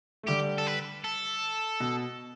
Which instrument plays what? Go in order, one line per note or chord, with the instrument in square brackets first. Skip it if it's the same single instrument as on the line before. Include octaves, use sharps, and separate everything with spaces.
[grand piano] A3
[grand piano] D3 G3 [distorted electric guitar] G4
[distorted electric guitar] A4
B4
A4
[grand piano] B2